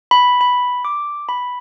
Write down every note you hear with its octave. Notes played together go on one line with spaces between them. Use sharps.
B5
B5
D6
B5